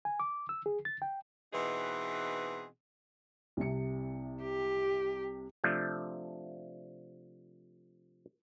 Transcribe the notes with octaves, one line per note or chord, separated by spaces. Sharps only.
G#5
D6
E6
G#4
A6
G5
B2 E3 C4 D#4 G#4
C2 C3 C#7
G4
C3 F3 A3 D4